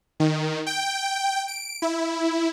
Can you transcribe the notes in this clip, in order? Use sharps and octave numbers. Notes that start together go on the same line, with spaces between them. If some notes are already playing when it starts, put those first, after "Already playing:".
D#3
G5
D7
E4